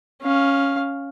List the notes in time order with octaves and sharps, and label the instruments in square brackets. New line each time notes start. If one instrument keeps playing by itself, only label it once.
[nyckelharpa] C#4 F5